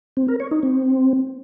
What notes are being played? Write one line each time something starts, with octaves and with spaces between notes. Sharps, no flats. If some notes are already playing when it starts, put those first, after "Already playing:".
C4
A#4
C#5
D#4
C4